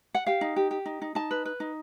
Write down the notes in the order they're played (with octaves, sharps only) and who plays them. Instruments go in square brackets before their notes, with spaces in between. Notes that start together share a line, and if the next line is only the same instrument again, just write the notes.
[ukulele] F#5
G4 F5
D#4
G4
G4
D#4
D#4
D#4 A5
B4
B4
D#4